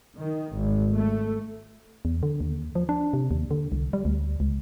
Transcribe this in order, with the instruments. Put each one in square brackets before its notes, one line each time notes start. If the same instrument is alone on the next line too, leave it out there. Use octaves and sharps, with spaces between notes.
[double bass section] D#3
G#1
A3
[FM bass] E2
D3
D#2
F3
D4
C3
D#2
D3
C2
G3
D2
C#2